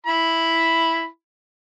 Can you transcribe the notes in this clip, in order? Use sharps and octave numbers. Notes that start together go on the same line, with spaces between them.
E4 B5